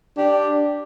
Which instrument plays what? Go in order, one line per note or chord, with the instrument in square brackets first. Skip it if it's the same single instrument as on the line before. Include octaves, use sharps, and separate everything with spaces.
[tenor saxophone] D4 [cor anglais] G4